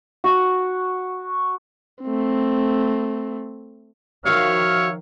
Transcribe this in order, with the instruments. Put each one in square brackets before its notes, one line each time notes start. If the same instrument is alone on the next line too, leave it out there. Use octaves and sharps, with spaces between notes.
[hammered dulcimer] F#4
[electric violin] A3 C4
[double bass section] D#3 F3 [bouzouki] F#4 F5 [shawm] C#5 [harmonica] E5 F6